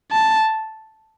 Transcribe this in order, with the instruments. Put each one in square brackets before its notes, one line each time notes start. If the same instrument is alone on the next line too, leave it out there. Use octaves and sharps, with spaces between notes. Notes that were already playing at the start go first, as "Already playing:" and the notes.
[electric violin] A5